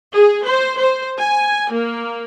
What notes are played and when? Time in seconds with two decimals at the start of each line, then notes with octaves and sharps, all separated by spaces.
0.14 G#4
0.46 C5
0.79 C5
1.20 G#5
1.72 A#3